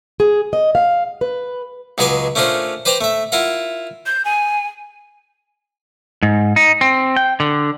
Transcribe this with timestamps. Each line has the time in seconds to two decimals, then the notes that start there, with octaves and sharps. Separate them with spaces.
0.20 G#4
0.53 D#5
0.75 F5
1.21 B4
1.98 C#2 F#3 G#3 B4 G#5 D6
2.35 A3 C#4 D4 F4 A#4 C5
2.85 B4 C5 D5 G5 A5 A#5
3.01 A3 E5
3.32 E4 F4 A#4 F#5
4.06 G6
4.25 G#5
6.23 G#2
6.56 D#4
6.81 C4
7.16 G5
7.40 D3